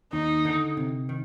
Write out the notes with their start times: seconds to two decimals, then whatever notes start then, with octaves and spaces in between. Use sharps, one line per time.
0.13 D#2 D#4
0.45 D3
0.77 C3
1.09 D#3